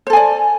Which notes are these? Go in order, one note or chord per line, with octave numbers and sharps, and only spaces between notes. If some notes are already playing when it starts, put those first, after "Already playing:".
A4 C5 D5 G#5